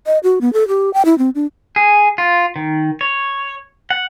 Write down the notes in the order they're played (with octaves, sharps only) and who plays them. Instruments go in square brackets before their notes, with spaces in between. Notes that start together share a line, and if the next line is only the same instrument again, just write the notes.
[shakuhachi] D#5
F#4
B3
A4
G4
G5
E4
C4
D4
[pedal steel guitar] G#4
F4
D#3
C#5
F#5